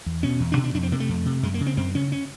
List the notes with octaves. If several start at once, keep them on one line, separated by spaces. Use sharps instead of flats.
E2
B2 C#4
E2
D4
B2
D4
F2 D4
C4
C3 A#3
A3
F2
C3
F#2 G#3
A#3
C#3
C4
F#2 C4
C#3 C#4
C#4